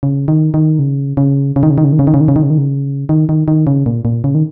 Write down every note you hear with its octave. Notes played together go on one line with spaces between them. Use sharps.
C#3
D#3
D#3
C#3
C#3
C#3
D#3
C#3
D#3
C#3
D#3
C#3
D#3
C#3
D#3
C#3
D#3
C#3
D#3
C#3
D#3
D#3
D#3
C#3
A#2
A#2
C#3
D#3